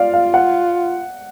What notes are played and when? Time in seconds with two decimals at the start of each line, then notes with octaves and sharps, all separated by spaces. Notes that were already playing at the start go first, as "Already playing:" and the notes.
Already playing: F4 D5 F5
0.13 F5
0.34 F#5